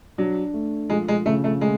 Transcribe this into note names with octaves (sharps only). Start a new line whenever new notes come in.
F#3 D4
A3
F3 G#3
G#3
C#3 A3
A3
G#3 A3